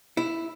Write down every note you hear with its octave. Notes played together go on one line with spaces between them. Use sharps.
E4